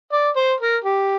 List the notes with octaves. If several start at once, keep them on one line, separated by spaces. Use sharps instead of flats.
D5
C5
A#4
G4